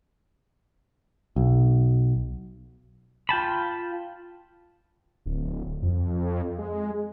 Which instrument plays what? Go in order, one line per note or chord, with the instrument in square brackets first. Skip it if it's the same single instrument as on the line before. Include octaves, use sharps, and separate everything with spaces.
[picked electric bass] B1
[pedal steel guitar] F4 G5 A5 B5
[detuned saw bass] D1
F2
G#3